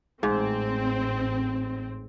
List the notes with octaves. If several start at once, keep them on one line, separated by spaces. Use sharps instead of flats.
A1 G#2 C4